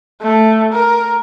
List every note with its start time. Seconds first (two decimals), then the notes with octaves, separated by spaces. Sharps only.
0.22 A3
0.73 A#4